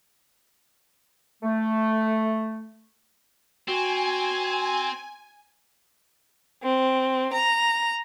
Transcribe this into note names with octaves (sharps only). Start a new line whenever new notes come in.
A3
C4 F#4 G#5
C4
A#5